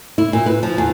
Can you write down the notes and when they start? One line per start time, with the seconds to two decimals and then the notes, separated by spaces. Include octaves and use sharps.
0.18 E4
0.33 A#2
0.46 B4
0.63 F3
0.78 E2